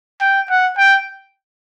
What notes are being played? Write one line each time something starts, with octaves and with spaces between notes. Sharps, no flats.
G5
F#5
G5